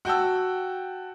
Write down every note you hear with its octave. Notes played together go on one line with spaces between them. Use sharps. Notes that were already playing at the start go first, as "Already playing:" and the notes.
F#4 G5 A5 E6